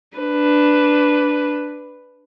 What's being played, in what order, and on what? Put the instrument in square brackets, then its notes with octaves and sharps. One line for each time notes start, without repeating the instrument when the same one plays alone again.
[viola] D4 B4